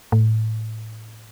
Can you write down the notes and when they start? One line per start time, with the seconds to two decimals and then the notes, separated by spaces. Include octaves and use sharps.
0.12 A2